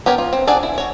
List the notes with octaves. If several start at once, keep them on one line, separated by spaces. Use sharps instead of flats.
B3 G4 A#4 C#5
F4
C4
D4 G#4 D5 F#5 G#5
E4
F#4 C#5